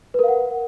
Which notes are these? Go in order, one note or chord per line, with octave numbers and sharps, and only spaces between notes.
A#4 B4 F5 F#5